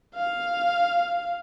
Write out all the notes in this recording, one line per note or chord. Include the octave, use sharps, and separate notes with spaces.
F5